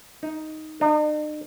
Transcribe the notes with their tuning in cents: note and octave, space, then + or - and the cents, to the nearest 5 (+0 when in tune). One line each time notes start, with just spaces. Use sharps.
D#4 +5
D#4 -45